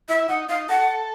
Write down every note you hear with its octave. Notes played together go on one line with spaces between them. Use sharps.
E4 E5
D#4 F#5
D#4 F5
A4 F#5